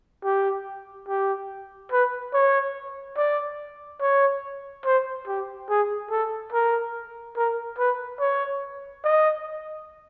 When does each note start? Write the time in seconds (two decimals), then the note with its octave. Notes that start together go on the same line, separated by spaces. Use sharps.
0.24 G4
1.08 G4
1.92 B4
2.34 C#5
3.17 D5
4.01 C#5
4.85 C5
5.27 G4
5.69 G#4
6.11 A4
6.52 A#4
7.36 A#4
7.79 B4
8.20 C#5
9.04 D#5